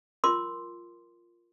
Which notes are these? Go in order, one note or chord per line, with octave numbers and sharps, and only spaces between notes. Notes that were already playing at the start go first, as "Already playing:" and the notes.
F4 A#4 C6 D6